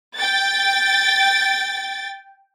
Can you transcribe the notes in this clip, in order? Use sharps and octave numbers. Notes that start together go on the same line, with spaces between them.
G5 A6